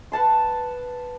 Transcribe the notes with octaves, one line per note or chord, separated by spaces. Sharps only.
B4 F#5 A5 C6